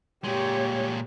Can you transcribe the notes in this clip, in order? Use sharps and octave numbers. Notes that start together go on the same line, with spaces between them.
A#2 G#3 G4 C#5